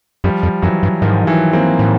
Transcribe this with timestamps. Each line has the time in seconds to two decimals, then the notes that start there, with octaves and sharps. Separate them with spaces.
0.24 F#2 F3 G3
0.43 F2
0.62 F#2 E3 F#3
0.83 G2
1.02 G#2 D#3 F3
1.27 E3 F#3
1.53 A#3 C4
1.79 A2